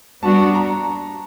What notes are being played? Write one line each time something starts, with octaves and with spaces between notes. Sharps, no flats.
G3 B3 D4 F#4 A5
A#5